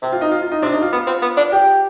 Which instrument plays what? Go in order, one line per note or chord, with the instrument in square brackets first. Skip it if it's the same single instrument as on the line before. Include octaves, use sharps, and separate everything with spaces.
[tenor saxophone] C3 [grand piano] G4
[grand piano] F4
D#4
F4
F4
D#4
[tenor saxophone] C3 [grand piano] D4
[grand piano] D#4
F4
[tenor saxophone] B3 [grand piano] F4
[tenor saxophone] C4
B3
D4
[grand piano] G4